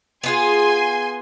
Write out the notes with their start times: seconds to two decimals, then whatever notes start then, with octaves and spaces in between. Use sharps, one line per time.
0.24 B3 F4 G#4 G#5 C6